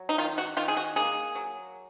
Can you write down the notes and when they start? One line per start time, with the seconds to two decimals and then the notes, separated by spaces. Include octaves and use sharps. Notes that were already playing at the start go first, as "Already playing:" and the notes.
Already playing: F#3
0.09 D#4
0.18 D#3 F4
0.38 F#4
0.57 D#3 F4
0.68 G#4
0.77 F#4
0.96 A#3 G#4
1.35 F#3